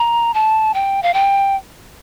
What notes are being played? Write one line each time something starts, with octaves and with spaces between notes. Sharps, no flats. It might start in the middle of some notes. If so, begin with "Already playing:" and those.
Already playing: A#5
A5
G5
F5
G5